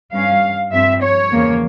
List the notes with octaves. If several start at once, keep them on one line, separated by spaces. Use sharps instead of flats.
G2 G3 C#4 F5
G2 F3 C4 E5
C#5
E2 C#3 F3 A#3